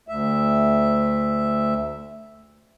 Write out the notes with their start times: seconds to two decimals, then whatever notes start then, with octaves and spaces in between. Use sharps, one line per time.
0.08 D2 E5